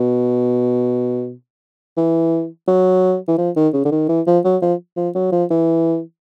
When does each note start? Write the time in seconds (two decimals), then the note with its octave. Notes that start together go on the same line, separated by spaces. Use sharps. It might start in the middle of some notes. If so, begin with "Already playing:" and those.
Already playing: B2
1.97 E3
2.68 F#3
3.28 E3
3.38 F3
3.56 D#3
3.73 C#3
3.85 D3
3.92 D#3
4.09 E3
4.27 F3
4.45 F#3
4.62 F3
4.97 F3
5.15 F#3
5.32 F3
5.51 E3